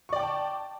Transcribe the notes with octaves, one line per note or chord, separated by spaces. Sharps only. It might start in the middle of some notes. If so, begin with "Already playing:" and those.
D5 G5 A5 C#6 D6